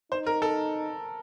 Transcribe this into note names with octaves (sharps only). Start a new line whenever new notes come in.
D#4 C5
A#4
A4